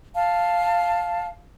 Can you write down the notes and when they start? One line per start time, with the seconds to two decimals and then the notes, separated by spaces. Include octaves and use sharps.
0.15 F5 A5